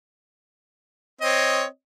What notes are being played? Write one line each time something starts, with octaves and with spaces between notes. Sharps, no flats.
C4 C#5 D#5